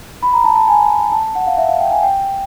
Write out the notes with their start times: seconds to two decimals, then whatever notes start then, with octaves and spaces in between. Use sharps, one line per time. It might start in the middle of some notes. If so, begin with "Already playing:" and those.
0.22 B5
0.33 A#5
0.44 A5
0.56 A5
0.68 G#5
1.12 A5
1.23 A5
1.35 F#5
1.47 F5
1.57 E5
1.69 F5
1.80 G5
1.91 G#5
2.03 G5